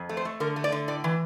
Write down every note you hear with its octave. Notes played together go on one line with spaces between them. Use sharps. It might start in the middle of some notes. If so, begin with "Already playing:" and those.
Already playing: F2
A3
C5
A3
D3 A#4
A3
D5
D3
A2 D5
E3